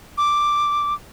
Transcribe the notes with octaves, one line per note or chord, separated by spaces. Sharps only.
D6